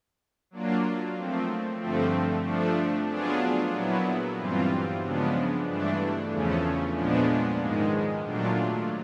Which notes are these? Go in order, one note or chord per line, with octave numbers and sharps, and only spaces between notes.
F#3 A#3 D4 F4
F3 A3 C4
G2 D3 F3 A3 C4
F3 A3 D4
F#3 B3 D4 F4 G#4
A#2 F#3 B3 E4
G2 E3 G3 C4 F4
C#3 F3 G#3 B3 D4
G2 E3 A3 D4
E2 C#3 F3 A3 C#4
A#2 F3 G#3 B3 D4
G#2 D#3 G#3
A#2 F#3 A3 D4 F4